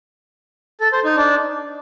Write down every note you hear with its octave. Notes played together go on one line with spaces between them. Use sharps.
A4
C5
D#4
D4